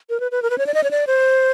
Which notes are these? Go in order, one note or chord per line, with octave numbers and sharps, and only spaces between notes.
A#4
B4
B4
A#4
B4
C#5
D5
D#5
C#5
D5
C5